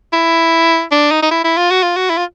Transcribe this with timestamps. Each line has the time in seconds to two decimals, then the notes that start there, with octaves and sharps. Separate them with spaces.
0.12 E4
0.92 D4
1.11 D#4
1.22 D#4
1.31 E4
1.44 E4
1.57 F4
1.70 F#4
1.83 F4
1.96 F#4
2.10 E4
2.17 F4